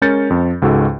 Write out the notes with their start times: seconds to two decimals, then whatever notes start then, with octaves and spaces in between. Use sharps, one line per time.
0.02 G#3 C#4 A#4 G6 A6 C#7
0.30 F2 C4
0.62 C#2 G#2 F#4 A4 E6